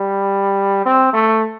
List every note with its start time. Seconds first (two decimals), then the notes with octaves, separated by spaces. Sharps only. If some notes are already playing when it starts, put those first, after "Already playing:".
Already playing: G3
0.86 C4
1.13 A3